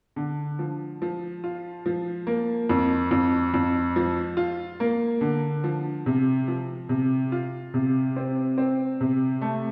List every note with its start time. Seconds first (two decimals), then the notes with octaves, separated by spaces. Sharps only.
0.16 D3
0.59 F3
1.02 F3
1.44 F4
1.86 F3
2.27 A#3
2.69 F2
3.11 F2
3.54 F2
3.96 F3
4.37 F4
4.80 A#3
5.21 D3
5.64 F3
6.06 C3
6.48 F3
6.89 C3
7.32 F4
7.74 C3
8.16 C4
8.58 C4
9.01 C3
9.41 A3